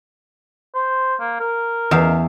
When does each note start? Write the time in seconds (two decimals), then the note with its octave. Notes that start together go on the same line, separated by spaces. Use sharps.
0.75 C5
1.20 A#3
1.40 A#4
1.91 E2 E5 F5